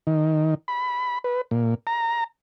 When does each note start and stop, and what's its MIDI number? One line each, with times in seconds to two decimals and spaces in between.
0.07 0.55 51
0.68 1.19 83
1.24 1.41 71
1.51 1.75 46
1.87 2.24 82